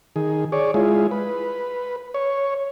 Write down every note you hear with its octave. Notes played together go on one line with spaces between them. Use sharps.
D#3 G#4
G#4 C#5 D5
G#3 E4 F4 G#4
B4
C#5